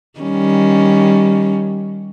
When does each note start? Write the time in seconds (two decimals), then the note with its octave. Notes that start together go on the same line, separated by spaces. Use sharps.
0.19 D#3 G3 C#4